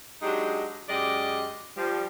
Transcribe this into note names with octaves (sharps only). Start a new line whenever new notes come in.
F#3 G#3 D4 D#4 G4
F#2 G#3 G4 D5 D#5
F3 G3